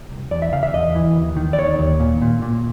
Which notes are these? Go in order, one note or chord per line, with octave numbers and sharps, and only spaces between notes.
C2
E2 D5
E5
C#3 F5
E5
E2 D#5
E3
D#2
D#3
D5
D#2 C#5
D#2
A#2
A#2
A#2